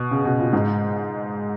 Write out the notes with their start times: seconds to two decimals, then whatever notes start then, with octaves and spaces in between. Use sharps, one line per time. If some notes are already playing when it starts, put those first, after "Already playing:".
Already playing: B2
0.11 C#3
0.25 B2
0.39 A#2
0.53 G#2